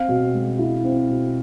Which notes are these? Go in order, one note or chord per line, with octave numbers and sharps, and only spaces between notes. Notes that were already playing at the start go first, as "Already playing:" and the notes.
Already playing: C4 F5
B2
G#3
E4
C4
B2